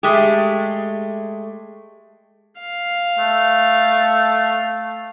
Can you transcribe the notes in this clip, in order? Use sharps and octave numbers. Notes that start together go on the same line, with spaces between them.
G#3 A3 G4
F5
A3